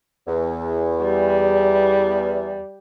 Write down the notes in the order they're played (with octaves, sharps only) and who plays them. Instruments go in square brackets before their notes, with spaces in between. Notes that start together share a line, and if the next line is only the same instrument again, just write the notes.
[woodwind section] E2
[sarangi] G3